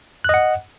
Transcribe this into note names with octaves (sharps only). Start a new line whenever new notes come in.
D#5 F#5 F#6